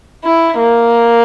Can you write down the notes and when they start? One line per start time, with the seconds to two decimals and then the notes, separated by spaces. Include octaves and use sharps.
0.25 E4
0.58 A#3